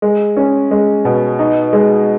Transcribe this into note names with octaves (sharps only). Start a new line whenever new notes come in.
G#3
C#4
G#3
B2
D#4
G#3